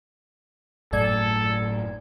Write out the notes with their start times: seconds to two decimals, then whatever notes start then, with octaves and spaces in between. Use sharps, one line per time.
0.93 G1 F#2 A2 A3 A4 D5 G#6